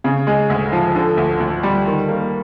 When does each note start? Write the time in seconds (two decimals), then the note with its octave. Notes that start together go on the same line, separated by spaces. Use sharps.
0.04 C#3
0.27 G#3
0.50 D2
0.72 F3
0.95 D3
1.17 D2
1.40 D2
1.63 G3
1.86 D#3
2.09 A#3